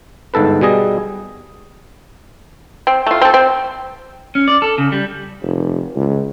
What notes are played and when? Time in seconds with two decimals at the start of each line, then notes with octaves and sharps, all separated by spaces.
0.34 G1 G#2 A4 B4
0.61 B2 G3 G#4 D#5
2.87 C4
3.07 A3 F4
3.21 C4 A4
3.34 C4
4.35 C#4
4.48 D5
4.62 A4
4.78 C#3
4.92 G3
5.42 F1
5.96 C#2